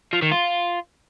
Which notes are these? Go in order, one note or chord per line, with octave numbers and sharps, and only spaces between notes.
F3
D#3
F4